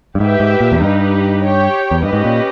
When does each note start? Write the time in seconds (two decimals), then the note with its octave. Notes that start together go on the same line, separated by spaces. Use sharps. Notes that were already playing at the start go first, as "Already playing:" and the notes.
0.15 G2
0.19 G#2 G4 B4 E5 G5
0.40 G#2
0.61 A#2
0.72 E2
0.81 G2 D#4 G4 B4
1.43 G4 C#5 G5
1.91 E2
2.03 G2 C#4 G4 B4 D#5
2.13 G#2
2.25 A#2